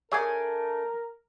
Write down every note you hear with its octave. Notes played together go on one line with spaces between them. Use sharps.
A3 D4 G#4 A#4 C#5 G#5